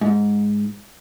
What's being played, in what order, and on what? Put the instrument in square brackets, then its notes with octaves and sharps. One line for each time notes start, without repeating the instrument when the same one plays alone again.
[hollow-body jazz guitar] G#2